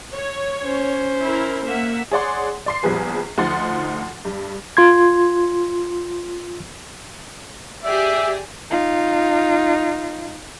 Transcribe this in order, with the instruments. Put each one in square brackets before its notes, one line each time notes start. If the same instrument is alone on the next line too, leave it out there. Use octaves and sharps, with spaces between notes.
[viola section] C#5
[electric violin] C#4 C5
[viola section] E4 A#4
A#3 E5 F#5
[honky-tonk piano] G#4 C#5 D5 F#5 C6
D5 C6 C7
A#1 E2 F3 G3 G#4 B4
D2 F3 D#4 F#5 C6 A6
G2
[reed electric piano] F4 C6 G#6
[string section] G4 G#4 D5 [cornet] E5
[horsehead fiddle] D#4 F4